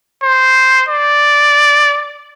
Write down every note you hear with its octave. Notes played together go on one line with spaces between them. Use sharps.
C5
D5